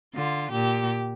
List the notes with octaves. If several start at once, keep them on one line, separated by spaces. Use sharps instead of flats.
D3 F4
A#2 G4